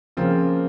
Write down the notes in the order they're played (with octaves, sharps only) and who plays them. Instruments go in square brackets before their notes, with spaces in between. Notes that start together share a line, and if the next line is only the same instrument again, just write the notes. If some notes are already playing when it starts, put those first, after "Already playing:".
[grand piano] C#3 F3 A#3 F4 [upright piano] C4